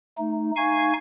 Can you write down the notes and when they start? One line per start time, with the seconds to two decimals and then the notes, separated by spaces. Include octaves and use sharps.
0.18 A3 D#4
0.56 D#4 F5 G#5 C#6 G#6